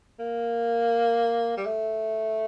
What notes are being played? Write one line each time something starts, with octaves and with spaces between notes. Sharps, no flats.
A#3
G3
A3